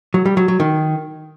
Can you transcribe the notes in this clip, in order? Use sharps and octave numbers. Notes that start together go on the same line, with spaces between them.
F#3
G3
F#3
F#3
D#3